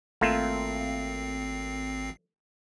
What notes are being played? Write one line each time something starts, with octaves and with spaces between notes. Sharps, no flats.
G#1 A3 A#3 C4 F4 C7